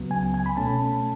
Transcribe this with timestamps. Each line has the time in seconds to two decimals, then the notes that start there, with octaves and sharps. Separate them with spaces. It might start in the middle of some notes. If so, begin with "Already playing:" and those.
Already playing: C#2 C#3 F#3 B3
0.11 G#5
0.34 G#5
0.46 B5
0.57 B2 A3 C#4 A5